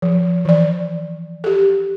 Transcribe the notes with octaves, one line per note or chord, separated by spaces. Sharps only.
F3
E3 D5
G4 A4